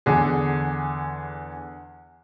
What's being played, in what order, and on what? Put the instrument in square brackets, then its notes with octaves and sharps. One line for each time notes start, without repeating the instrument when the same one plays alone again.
[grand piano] E2 D3 G#4